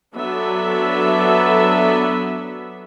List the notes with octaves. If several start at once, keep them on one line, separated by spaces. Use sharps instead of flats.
F#3 B3 D4 A4 E5